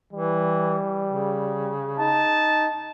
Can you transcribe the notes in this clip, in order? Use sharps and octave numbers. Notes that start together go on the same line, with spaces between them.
E3 G3
C#3
D#4 A5